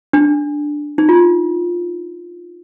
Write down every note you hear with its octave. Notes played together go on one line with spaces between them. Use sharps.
D4
D#4
F4